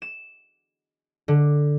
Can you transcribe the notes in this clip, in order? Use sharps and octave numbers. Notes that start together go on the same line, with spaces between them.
E7
D3